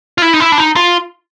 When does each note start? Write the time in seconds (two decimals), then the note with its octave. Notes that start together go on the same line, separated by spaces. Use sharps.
0.18 F4
0.22 E4
0.34 D#4
0.40 E4
0.52 D4
0.58 D#4
0.76 F4